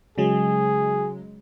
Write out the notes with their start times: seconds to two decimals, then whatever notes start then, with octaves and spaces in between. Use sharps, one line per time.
0.18 C#3 F#3 G#3 G#4